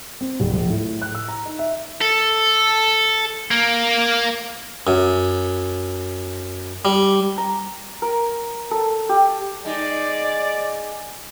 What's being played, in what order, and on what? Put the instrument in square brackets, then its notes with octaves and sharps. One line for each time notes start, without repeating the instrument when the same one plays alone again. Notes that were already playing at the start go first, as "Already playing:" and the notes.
[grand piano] C4
D1
A#1
A2
F#6
E6
A#5
D#4
E5
[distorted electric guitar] A4
A#3
[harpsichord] F#2
G3
[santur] A#5
A#4
A4
G4
[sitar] G#3 D#4 [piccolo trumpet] D5